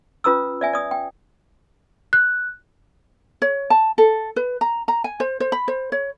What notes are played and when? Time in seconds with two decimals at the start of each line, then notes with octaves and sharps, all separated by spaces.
0.24 C#4 F4 B4 A#5 D#6 E6
0.61 D5 E5 G#5
0.73 D5 D#6
0.91 G5
2.13 F#6
3.42 C#5
3.70 A5
3.98 A4
4.36 B4
4.61 A#5
4.88 A#5
5.04 G#5
5.20 C5
5.40 C5
5.52 B5
5.68 C5
5.92 C#5